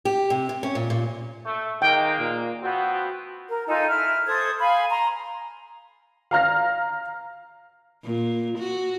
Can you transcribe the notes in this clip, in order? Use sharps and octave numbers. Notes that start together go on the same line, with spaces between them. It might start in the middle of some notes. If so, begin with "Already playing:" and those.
G4
C3
C3
C#4
A#2
A#2
A3
D#3 G#3 A#3 G5
A#2
F3 B3 C4 F#4
A#4
D#4 F4 A4 G#5
E4 F6
A4 C5 D#6 G#6
F5 G#5 B5
A#5 C6
F5 A#5 F6 A#6
A#2
F#4